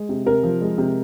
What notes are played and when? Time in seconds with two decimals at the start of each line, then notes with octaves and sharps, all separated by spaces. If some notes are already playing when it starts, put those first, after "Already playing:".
Already playing: G#3
0.09 C3
0.26 C3 A#4
0.43 F3
0.61 G#3
0.78 C3